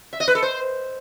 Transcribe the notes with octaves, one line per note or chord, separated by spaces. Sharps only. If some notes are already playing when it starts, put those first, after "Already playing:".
E5
D#5
B4
A4
C5